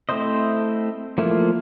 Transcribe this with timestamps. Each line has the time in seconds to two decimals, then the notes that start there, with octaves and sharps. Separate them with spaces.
0.09 A3 C4 E4 C5 D#5
1.18 F3 A3 A#3 E4 F4